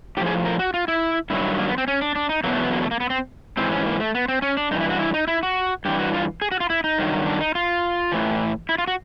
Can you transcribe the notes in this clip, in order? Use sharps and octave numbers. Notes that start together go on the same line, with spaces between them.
A2 F3 G4 G#4
A#4
F#4
F4
E4
G2 D#3 F#3 E4
A#3
B3
C4
C#4
D4
D4
D#4
E2 B2 F#3 A#3
A3
B3
A#3
A3
A#3
B3
C4
G#2 E3 C4
C#4
A#3
A3
B3
C4
C#4
D4
G2 E3 D#4
E4
F#4
E4
D#4
E4
F#4
G2 E3 G4
F#4
F4
G#4
F#4
F4
E4
D#4
G2 D#3 F#3
D4
D#4
F4
A2 E3
E4
F4
F#4